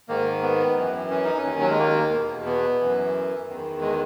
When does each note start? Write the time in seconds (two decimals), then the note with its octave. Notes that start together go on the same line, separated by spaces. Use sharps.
0.08 G#2 D#3 A#3
0.42 B3
0.76 F#2 E3
1.11 C#4
1.24 D#4
1.38 C#4
1.45 D#2 D#3
1.61 F#3
1.70 G#3
1.78 A#3
2.12 E2 B2
2.46 B3
2.80 F#2 E3
3.48 E2 D#3
3.81 G#3